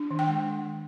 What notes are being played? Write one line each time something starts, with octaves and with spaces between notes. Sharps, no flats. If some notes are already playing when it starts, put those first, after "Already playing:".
Already playing: D4
D#3
G5
G#3